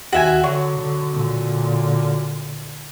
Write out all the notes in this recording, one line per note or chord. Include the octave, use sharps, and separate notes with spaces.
D#2 F#4 E5 G#5
D3 F#3
D3
A#2 D3